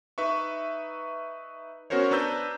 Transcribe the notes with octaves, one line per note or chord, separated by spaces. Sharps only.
D#4 B4 E5 C#6
B3 C#4 F#4 A#4 C5 C#5
D4 B4 A#5 E6 G6